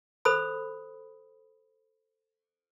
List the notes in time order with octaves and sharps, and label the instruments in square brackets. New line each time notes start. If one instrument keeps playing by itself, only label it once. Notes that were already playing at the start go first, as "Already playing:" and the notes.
[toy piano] A4 C5 B5 D#6